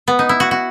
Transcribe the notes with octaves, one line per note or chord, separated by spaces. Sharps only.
B3
D#4
E4
F#4
F#4